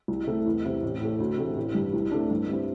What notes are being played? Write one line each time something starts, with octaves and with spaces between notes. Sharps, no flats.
C2
C3 A3 E4
E2
C3 G3 C4 E4
A1
A2 A3
D2
C3 E3 A3
A1
G2 G3
C2
C3 A3 D4
G2
G3 C4 E4